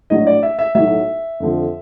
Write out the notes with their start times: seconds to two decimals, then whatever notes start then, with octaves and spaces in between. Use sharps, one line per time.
0.10 A#1 A2 F#3 A3 D#5
0.27 D5
0.43 E5
0.59 E5
0.75 B1 A2 F#3 E5
1.40 F2 D3 F3